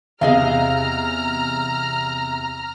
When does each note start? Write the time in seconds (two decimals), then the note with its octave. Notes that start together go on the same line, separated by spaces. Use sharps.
0.21 E2 C3 G#4 D#5 F5 A#5 F6